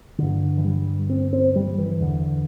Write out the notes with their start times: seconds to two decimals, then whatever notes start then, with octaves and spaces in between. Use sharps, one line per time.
0.18 G2 D3
0.57 E3
0.64 G3
1.09 C4
1.33 C4
1.56 G3
1.78 E3
2.01 E2 D3